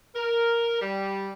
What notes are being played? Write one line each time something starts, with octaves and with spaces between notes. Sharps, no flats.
A#4
G3